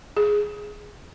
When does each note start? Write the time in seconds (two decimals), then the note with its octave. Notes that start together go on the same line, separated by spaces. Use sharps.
0.17 G#4